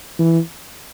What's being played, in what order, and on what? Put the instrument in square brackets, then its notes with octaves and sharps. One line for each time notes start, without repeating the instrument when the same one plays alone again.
[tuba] E3